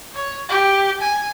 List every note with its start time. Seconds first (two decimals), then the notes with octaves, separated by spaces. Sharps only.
0.14 C#5
0.49 G4
1.01 G#5